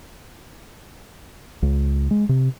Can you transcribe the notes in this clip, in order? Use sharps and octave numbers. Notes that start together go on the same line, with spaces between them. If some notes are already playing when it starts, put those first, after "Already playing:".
C#2
G#3
C3